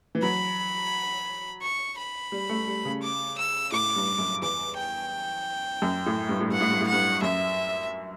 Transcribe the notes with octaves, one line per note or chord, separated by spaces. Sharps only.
E3
F#3 B5
C#6
B5
G3
A3
G3
C#3
D6
E6
A2 D6
G2
F#2
E2 D6
G5
F#2
A2
G2
A2
G2 F#5
A2
G2
A2
F#5
G2
F#2 E5